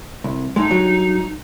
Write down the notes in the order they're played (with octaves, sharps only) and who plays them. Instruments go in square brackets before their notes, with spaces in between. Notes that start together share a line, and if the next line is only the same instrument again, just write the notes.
[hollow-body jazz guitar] C2
[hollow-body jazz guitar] A2 G#3 [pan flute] D#4
[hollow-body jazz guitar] G2 F#3